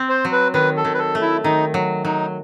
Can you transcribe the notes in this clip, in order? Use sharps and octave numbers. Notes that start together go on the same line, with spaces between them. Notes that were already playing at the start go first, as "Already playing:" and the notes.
Already playing: C4
C5
F#3
B4
D#3 B4
A4
D#3
B4
A4
A3
E4
D#3 D#4
F#3
F#3 D#4